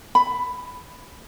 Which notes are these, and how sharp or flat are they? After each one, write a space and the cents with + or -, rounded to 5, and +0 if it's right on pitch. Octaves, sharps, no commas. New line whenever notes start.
B5 +10